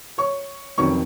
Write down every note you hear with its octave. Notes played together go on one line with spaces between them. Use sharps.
C#5 C#6
F1 F2 D#3 F#3 C#4 C#5 C#6